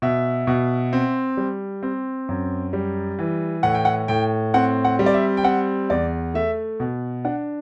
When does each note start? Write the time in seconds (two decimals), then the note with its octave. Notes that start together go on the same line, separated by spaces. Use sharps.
0.02 B2 E5
0.47 B2
0.93 C4
1.37 G3
1.83 C4
2.29 F#2
2.73 G3
3.19 E3
3.63 A2 F#5
3.74 G5
3.85 F#5
4.08 A2 G5
4.54 C4 F#5
4.84 F#5
4.99 G3
5.06 D5
5.14 E5
5.37 G5
5.44 C4 F#5
5.90 E2 D5
6.34 A3 E5
6.80 B2
7.25 D4 F#5